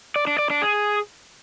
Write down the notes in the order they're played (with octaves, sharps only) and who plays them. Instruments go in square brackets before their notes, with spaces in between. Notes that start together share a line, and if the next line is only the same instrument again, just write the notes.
[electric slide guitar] D5
D4
D5
D4
G#4